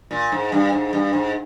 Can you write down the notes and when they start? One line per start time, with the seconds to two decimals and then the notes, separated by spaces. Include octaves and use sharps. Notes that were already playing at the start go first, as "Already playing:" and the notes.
0.11 A#2
0.32 G#2
0.52 G2
0.73 G#2
0.93 G2
1.13 G#2